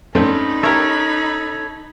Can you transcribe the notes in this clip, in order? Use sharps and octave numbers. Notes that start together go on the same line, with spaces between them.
G2 A3 C4 C#4 D#4 B5
G4 A4 A#4 C#5 E5